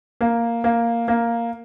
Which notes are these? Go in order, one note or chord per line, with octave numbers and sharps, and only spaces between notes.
A#3
A#3
A#3